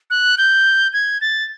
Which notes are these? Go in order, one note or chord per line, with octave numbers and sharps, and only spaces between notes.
F#6
G6
G#6
A6